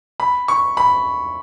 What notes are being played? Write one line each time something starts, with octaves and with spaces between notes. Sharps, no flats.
B5
C#6
B5